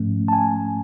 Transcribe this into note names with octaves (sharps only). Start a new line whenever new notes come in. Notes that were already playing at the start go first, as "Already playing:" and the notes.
Already playing: G#2 F3 A3 C#4
A5
G#5